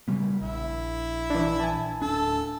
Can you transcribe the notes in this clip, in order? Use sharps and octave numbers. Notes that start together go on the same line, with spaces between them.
C#3 G3 B3
A#1 E4
E3 D4
G#5 A5
D1 D4 A4